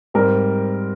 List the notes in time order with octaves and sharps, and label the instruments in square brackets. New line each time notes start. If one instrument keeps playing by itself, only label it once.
[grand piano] G#2 G3 C4 [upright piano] A#4